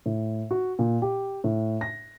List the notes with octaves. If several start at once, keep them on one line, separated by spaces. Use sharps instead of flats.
A2
F#4
A#2
G4
A2
A#6